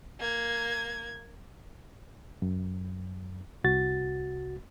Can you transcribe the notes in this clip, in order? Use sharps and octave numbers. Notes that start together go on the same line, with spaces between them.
A#3 G#6
F#2
C2 F#4 A6